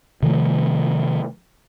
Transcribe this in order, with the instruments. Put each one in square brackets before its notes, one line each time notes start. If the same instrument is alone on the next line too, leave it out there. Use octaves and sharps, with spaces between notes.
[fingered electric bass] C3 D#3 F3 A3